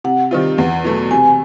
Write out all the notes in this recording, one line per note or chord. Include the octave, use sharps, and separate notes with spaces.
C3 F#5
D#3 G3 C4 F4
E2 F#5
B2 F#3 A3
C3 G#5